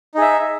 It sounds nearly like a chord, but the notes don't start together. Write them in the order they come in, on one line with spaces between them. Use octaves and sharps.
D#4 G#4 E5